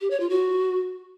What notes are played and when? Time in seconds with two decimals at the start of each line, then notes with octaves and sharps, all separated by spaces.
0.01 G4
0.11 C#5
0.20 F4
0.30 F#4